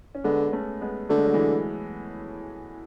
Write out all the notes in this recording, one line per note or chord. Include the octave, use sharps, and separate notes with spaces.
C#4
D3 G#3 B3
A3 C#4
G#3 B3
D3 A3
G#3
F#3
E3 G#3